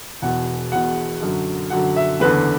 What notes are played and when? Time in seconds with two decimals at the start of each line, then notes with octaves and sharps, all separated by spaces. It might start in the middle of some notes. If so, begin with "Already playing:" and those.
0.22 E1 E2 B2 F#5
0.72 E1 E2 B2 F#5
1.22 F#2 D3 F#3
1.70 F#2 D3 F#3 F#5
1.96 E5
2.20 F#1 E2 D3 B4